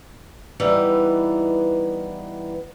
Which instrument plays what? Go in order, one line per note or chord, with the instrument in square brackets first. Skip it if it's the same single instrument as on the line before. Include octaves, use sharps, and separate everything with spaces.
[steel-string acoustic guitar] E3 G3 B3 D#4